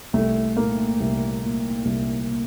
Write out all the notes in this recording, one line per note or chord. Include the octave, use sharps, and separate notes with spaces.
C2 A3
A#2 A#3
C2
A#2
C2
A#2